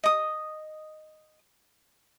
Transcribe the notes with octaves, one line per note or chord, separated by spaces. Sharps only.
D#5 D#6